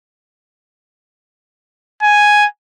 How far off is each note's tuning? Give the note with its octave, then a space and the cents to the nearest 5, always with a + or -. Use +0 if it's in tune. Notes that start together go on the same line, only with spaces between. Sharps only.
G#5 +0